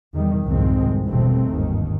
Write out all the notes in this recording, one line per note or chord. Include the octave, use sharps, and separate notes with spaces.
E2 D#3 G3
C2 F2 G#2 D#3 G#3 C4
G1 E2 G2 B2 A3 C4
G1 D#2 G#2 D#3